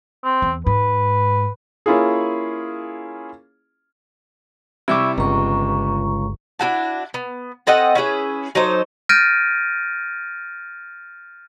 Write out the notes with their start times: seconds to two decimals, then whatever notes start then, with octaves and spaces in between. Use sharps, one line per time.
0.24 C4
0.42 E2
0.67 G#2 B4
1.86 A#3 C#4 E4 F4 G#4
4.88 C3 G3 E4 C#6 D6 E6
5.18 G1 C#2 A#5 C#6
6.59 D4 E4 F#4 A5
7.14 B3
7.67 C4 A4 D#5 F#5
7.95 C#4 E4 G#4 B4
8.55 F#3 D#4 A4 C5
9.09 F6 G6 A6 A#6 D7 D#7